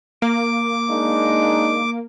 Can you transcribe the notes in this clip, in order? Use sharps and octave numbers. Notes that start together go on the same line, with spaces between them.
A#3 D6
G#3 D4 D#4